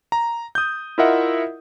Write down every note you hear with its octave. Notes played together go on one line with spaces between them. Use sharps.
A#5
D#6 G6
E4 F4 A#4 D#5 E5 F#5